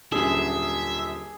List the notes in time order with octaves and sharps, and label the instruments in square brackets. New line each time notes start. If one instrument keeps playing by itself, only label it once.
[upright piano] D#1 F#2 D3 [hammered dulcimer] G#4 [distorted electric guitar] E5